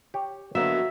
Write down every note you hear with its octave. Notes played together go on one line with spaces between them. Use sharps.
G4 C#5
D3 F#3 A#3 B3 F#4 D#5 E5